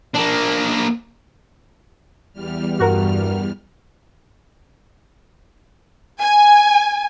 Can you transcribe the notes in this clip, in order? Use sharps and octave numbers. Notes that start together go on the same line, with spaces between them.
A#3 D4
E2 G3 F6
G2 F#4 A#4
G#5